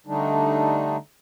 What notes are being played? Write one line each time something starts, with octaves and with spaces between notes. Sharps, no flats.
D3 G3 A3 D4 D#4